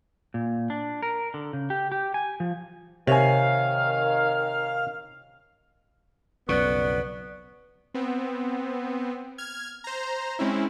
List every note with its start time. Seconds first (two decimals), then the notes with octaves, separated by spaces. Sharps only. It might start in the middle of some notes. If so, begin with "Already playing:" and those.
0.34 A#2
0.70 D4
1.02 A#4
1.34 D3
1.53 C#3
1.70 G4
1.92 G4
2.14 G#5
2.40 F3
3.07 C3 D#3 C#5 F5 G#5
6.49 B1 F2 C#3 B3 D5 C#6 F#6
7.94 B3 C4
9.38 F6 G#6
9.84 C5 A#5
10.39 G#3 C4 C#4 E4